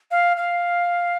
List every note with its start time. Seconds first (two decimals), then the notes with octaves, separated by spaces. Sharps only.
0.11 F5
0.37 F5